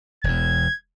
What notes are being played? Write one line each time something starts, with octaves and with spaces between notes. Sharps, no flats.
E1 E2 G#6